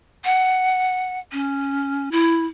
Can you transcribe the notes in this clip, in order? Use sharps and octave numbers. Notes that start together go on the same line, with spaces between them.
F#5
C#4
E4